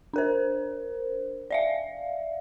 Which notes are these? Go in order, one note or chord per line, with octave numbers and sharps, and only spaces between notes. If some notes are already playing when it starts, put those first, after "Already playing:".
D4 A#4 C5
D5 E5 F5